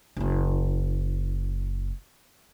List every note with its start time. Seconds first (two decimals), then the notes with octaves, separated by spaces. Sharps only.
0.17 F#1 E4